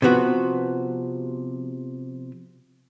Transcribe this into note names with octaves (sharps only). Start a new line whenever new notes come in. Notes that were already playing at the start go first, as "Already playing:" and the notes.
C3 F3 B3 F#4